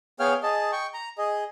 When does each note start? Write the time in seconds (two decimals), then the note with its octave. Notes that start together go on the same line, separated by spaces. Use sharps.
0.20 B3 G#4 C#5 F5 G5 F6
0.43 G#4 D#5 A5
0.72 G5 C#6
0.94 A#5
1.18 G#4 D#5